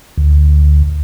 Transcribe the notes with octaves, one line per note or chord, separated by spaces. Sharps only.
D2